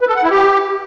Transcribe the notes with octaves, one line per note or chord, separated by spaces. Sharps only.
B4
A4
F#5
E4
G4